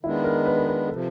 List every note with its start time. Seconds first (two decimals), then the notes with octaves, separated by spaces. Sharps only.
0.03 D#3 G#3 B3 D4 E4
0.24 A#4
0.46 B4
0.56 A#4
0.67 B4
0.89 C3 F3 A4